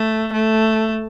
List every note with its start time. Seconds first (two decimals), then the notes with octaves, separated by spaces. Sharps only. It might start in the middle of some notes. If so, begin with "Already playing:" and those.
Already playing: A3
0.33 A3